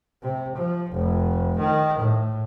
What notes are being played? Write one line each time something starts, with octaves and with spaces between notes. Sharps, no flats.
C3
F3
F1
D#3
A2